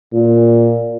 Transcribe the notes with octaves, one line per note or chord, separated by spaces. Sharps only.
A#2